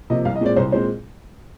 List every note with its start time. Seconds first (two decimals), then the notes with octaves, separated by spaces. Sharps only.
0.10 C3 F3 A#3 D#5
0.25 C2 F5
0.36 D#5
0.41 A#2 G#3 C4 D5
0.56 C2 C5
0.72 A#2 G#3 C4 C5